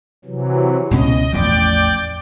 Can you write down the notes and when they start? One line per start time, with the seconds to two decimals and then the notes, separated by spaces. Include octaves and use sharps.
0.25 C3 E3 F#3
0.91 C#2 B2 C#4 D#5
1.33 A1 E2 F3 D5 G5 D6